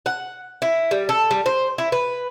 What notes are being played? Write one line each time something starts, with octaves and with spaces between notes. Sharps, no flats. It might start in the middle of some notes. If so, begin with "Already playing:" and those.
F#5
E4
G3
A4
G3
C5
E4
B4